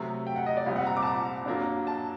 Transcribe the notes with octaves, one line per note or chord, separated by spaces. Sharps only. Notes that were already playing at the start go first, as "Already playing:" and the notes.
Already playing: C3 F#3 A3 A#5
G5
F#5
D#5
D5
C2 A#2 G3 C4
F#5
A#5
D6
A5
A#5
F#2 F#3 A#3 D4
A5